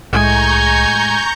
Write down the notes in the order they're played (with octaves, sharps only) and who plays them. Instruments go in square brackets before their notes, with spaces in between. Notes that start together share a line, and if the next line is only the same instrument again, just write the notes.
[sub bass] C2 [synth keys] A2 G#3 [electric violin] G#5 [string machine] A#5 C#6 G6